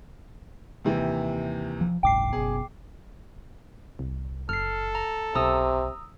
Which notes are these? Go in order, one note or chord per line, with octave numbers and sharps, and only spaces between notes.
D#2 C3 E3
F3
F#1 C2 G#2 G5 D6 C7
F#1 B2 G#4
C2
F#1 A4 F6 C7
A#5
B1 C3 A#5 D#6 E6